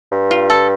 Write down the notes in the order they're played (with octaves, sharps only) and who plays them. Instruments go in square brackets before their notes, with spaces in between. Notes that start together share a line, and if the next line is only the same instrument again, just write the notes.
[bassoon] G2
[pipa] F4
A4